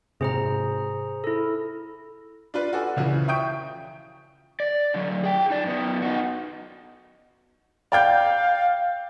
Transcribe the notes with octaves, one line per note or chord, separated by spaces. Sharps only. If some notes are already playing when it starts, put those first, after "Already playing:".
G#2 C3 G#4 C5 A#5
E4 A4
D4 F4 B4 D5
F#4 A4 D5 G#5
C#2 C#3 E3 F3
E5 G5 C#6 D#6 G6 D7
D5
D3 F#3
G#4 G5
D#4 D5
F#2 B3
D#4 F#4
D5 F5 G5 G6